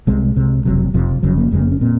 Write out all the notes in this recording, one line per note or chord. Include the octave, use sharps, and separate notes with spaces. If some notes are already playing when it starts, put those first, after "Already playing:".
C2 C3 G#3
C2 C3
F#1 F2 C3 F#3
F#1 F2 C3 F3
F1 F2 C#3 F#3
A#3
F1 F2 C#3 G#3
A#3
C#4
A#2 C4